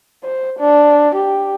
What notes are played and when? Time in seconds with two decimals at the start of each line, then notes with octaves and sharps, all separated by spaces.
0.24 C5
0.59 D4
1.15 G4